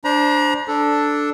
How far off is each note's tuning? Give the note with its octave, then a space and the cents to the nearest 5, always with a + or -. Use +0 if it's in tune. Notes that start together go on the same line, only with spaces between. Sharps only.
D4 +0 C5 +0 A#5 +40
D4 +0 A4 +0